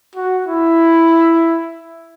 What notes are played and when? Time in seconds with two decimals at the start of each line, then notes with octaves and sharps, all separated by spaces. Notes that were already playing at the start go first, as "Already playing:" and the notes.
0.15 F#4
0.46 E4